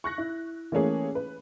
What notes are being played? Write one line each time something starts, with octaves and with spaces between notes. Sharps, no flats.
C#6 F#6 A#6
E4
E3 A3 A#3 C#4 G#4
B4